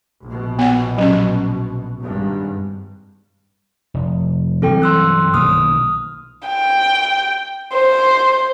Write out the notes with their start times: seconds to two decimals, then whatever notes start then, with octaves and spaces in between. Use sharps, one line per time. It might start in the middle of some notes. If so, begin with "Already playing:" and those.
0.23 A#1 B2
0.59 B3 F#5
0.98 F#3 C#4
2.01 G#1 G2
3.94 F1
4.62 G2 E3 F#3 C4 A4 G5
4.82 C6 E6 F#6
5.34 B1 D#3 A#3 D#6 F6
6.47 G5
7.73 C5